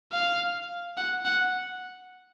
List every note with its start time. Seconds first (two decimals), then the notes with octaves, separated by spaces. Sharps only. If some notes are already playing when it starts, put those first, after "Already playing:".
0.12 F5
0.97 F#5
1.25 F#5